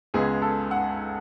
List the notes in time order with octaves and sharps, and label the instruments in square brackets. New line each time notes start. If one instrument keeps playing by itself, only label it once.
[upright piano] C#2 C#3 G#3 B3 G#4
A4
F#5